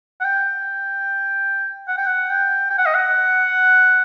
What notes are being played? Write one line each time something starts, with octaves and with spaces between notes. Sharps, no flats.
F#5
G5
F#5
G5
F#5
G5
G5
F#5
D#5
F#5